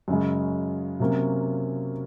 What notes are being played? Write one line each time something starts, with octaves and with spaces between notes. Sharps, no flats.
F#2 C#3 G#3
C3 F#3 A#3 C#4